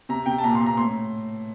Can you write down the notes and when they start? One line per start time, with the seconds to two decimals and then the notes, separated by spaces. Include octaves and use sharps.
0.09 C3 A#5
0.26 C3 G5
0.38 A5
0.43 A#2 A#5
0.55 C6
0.60 A#2
0.66 A#5
0.78 A2 C6